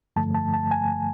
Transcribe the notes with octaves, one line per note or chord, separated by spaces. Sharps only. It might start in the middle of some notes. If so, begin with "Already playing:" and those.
G2 D3 F3 A3 A5
A5
A5
G#5